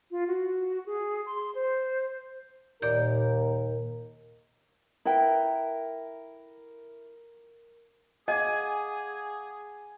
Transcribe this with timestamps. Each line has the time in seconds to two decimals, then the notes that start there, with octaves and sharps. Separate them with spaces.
0.11 F4
0.27 F#4
0.86 G#4
1.26 C6
1.55 C5
2.82 D#2 A#2 A#4 D5 G6
5.05 E4 A#4 B4 G5
8.28 G#4 D#5 F5 F#5 G#5 D6